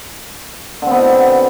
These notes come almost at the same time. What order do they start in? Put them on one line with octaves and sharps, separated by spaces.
D3 C4 B3 B2